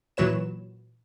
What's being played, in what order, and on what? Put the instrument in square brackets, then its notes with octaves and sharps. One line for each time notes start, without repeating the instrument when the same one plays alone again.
[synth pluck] A#2 E3 F#3 B4 C#5 E7